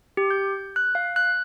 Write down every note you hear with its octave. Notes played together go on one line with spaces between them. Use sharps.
G4
G6
F#6
F5
F#6